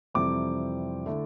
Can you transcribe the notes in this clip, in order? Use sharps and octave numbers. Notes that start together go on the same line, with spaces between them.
F2 C3 E3 G3 C4 D6
D3 A3 E4